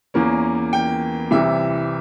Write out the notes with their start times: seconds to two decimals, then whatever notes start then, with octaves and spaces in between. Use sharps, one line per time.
0.14 E2 E3 A#3 C#4
0.73 G5
1.31 C2 C3 E3 E5